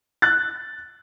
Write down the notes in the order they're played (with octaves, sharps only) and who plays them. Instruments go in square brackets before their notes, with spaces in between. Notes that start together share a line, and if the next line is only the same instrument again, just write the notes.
[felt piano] F#6 A6